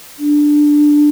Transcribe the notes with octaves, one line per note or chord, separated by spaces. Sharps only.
D4